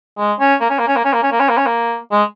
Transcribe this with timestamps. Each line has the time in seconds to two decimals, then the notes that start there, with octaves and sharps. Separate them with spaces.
0.18 G#3
0.40 C#4
0.61 A#3
0.70 C#4
0.79 A#3
0.88 C#4
0.97 A#3
1.05 C#4
1.14 A#3
1.23 C#4
1.32 A#3
1.40 C#4
1.49 A#3
1.58 C#4
1.66 A#3
2.12 G#3